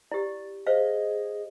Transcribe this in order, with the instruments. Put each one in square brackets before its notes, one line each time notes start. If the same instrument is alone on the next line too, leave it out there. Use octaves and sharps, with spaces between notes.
[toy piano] E4 G4 [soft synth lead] D5
[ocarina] G#4 [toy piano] C5 F5 [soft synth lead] D#5